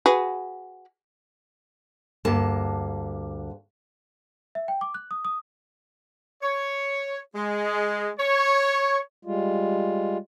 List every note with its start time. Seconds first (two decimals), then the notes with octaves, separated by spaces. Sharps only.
0.06 F#4 G#4 B4
2.25 D2 G2 A#3 A5
4.55 E5
4.68 G5
4.81 D6
4.94 F#6
5.11 D#6
5.25 D#6
6.43 C#5
7.35 G#3
8.20 C#5
9.25 G3 G#3 F4